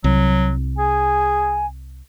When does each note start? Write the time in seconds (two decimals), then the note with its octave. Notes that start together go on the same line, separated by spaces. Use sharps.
0.04 C2 F#3
0.77 G#4 G#5